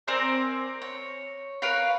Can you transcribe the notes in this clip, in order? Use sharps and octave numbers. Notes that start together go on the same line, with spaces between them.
C4 A#4 D5 G#5
C#5
A#4 B4 C#5 F5